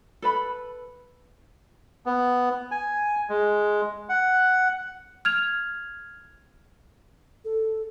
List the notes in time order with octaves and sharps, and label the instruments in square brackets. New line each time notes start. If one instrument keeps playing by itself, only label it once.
[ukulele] A4 B4 B5
[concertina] B3
G#5
G#3
F#5
[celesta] F6 G#6 F7
[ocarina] A4